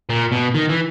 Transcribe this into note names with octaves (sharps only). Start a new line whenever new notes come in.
A#2
B2
D#3
E3